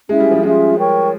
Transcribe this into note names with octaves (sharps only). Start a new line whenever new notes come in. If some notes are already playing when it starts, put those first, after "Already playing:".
G#3 C#4 E4 G#4 E5
G3
F3
G#3 C#4 F4 G#4 E5
A#4 C#5 G5 C#6